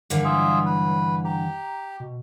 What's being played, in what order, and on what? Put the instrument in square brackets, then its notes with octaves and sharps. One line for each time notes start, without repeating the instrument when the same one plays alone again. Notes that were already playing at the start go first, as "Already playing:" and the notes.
[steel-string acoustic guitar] G2 D3 E3 [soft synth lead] A#4
[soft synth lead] F#3 [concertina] F4 G#4 E5
[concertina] B4
[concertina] G4 [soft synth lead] A#5
[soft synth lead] B2